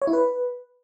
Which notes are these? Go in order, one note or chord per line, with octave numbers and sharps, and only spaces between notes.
C#5
E4
B4